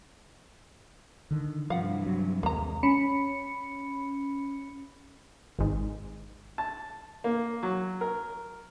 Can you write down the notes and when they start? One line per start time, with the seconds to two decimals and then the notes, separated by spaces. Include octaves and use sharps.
1.31 D3 D#3
1.70 G2 C3 E3 F3 F5 F#5
2.06 F#3
2.43 D#2 G#3 A#3 A#5
2.83 C#4 B5 C#7
5.59 G#1 G#2
6.58 A5
7.24 A#3
7.63 F#3
8.01 A#4